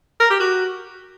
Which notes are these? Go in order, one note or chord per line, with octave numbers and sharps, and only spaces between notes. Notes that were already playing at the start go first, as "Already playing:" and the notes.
A#4
G4
F#4